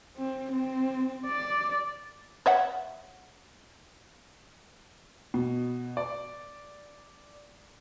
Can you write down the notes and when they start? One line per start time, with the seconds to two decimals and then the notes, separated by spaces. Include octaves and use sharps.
0.17 C4
0.52 C4
1.27 D5
2.46 C#5 E5 F#5
5.34 B2
5.97 D5